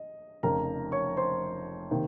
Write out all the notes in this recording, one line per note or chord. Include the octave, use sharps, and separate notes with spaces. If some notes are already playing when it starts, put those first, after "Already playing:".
Already playing: D#5
F1 F2 C#3 A#4 A#5
C#5 C#6
C5 C6
C3 D#3 A#3